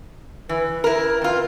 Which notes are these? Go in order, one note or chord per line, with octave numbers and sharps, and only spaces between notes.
E3 B4
E4 A#4
F2 F4